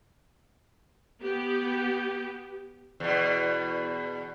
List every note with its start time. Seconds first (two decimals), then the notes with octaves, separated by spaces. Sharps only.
1.24 B3 G4
3.00 E2 B2